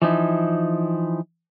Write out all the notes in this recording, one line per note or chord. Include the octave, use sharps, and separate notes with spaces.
E3 F3 D#4 E4